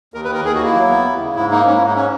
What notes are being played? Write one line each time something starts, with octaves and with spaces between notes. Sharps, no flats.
D#2 A#4
B4
D#3 A#4
D#2 G#4
F#4
A#3 E4
F#3
B3
D#2
C#3
G#2 E4
A#3 D#4
G#2 C#4
E4
G#2 D#4
C#4